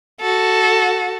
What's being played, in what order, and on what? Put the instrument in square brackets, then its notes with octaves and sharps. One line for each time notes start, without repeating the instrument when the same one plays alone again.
[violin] F#4 A4